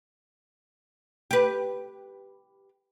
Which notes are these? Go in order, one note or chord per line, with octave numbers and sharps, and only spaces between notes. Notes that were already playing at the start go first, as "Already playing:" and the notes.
G4 B4